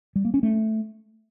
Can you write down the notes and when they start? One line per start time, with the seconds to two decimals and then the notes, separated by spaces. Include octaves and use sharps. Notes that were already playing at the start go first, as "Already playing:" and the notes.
0.16 G3
0.25 A#3
0.34 C#4
0.43 A3